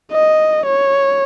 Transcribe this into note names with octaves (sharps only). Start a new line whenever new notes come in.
D#5
C#5